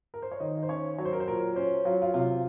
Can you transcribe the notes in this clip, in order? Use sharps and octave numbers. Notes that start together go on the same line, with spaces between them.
A#4
C5
C#5
D#3 D#5
C5
C#4 C#5
F#3 C#5
C5
A#4
C5
A#2 A#4
C#4 C5
F#3 F4
F4
C3 F4